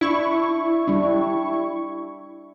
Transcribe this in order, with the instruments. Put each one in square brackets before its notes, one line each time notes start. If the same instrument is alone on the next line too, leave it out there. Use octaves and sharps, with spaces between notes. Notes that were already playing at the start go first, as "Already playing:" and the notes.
[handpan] D4 [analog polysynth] E4 C#6
[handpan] G3 D4